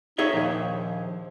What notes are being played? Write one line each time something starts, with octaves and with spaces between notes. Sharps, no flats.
D#4 G#4 C#5 E5
A#1 D#2 F3